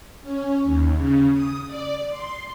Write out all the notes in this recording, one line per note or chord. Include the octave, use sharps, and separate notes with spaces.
C#4
D#2
C#3
D#6
D5
C6